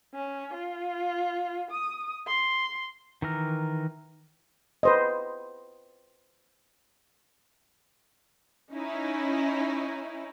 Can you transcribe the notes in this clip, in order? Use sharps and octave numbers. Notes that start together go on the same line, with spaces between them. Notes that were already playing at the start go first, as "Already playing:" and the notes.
C#4
F4
D#6
C6
D#3 E3 A#4
B4 C5 D#5
C#4 D#4 E4